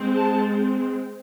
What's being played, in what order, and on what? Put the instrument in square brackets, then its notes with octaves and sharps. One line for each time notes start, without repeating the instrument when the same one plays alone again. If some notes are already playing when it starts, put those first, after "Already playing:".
Already playing: [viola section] G#3 C4
A5